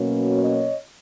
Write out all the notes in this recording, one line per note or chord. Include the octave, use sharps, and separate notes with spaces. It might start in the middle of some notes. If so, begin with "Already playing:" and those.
Already playing: B2 F#3 A#3 C#4
C#5 D#5